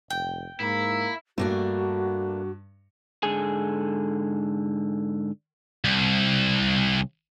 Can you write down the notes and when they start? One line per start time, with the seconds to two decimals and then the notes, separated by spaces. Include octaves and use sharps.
0.10 F1 G5
0.60 G#2 A#3 E4
1.38 G2 A3 A#3 D4 F#4
3.23 G#2 D3 G#4 A4 G#5
5.85 C2